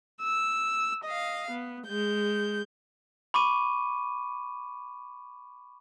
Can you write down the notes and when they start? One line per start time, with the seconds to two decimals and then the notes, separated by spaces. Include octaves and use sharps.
0.23 E6
1.04 D#5 F5
1.50 B3
1.87 G#3 G6
3.34 B5 C#6 D6 D#7